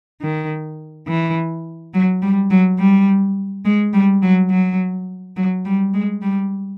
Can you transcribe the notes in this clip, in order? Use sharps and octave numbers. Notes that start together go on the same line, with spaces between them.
D#3
E3
F#3
G3
F#3
G3
G#3
G3
F#3
F#3
F#3
G3
G#3
G3